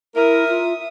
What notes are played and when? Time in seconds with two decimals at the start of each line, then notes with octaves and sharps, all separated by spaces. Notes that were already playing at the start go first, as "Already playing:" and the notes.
0.16 E4 A#4 E5 D#6
0.49 F4